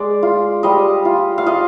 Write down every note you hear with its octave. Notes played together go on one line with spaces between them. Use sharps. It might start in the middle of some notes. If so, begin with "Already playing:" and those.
Already playing: G#3 D5
F4
G3 D#5
F4
F5
F4 D#5